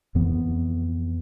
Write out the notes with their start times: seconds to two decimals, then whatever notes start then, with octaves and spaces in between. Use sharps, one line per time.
0.15 F2 E3 B3